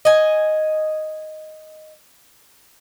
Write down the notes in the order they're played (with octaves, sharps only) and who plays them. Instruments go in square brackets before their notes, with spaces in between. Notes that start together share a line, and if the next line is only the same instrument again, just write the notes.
[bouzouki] D#5 G#5